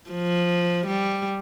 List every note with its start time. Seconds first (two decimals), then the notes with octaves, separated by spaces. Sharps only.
0.10 F3
0.87 G3